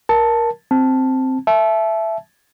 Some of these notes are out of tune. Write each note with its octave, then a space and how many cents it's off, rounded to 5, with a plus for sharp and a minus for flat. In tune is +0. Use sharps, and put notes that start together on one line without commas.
A#4 +10 A5 +0
C4 +0 A5 +0
E5 +10 A5 -30